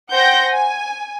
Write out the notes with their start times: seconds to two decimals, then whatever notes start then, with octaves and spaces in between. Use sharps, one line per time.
0.11 C5 F#5 G5 G6 A#6
0.50 G#5